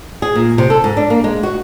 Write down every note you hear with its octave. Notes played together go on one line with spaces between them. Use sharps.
G#4
A#2
C3
A4
G#2
D4
A#3
G#3
F#4